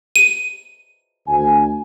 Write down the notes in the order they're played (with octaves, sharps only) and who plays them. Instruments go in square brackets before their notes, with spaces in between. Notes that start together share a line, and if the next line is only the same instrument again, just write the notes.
[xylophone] D#7
[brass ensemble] D2 G#5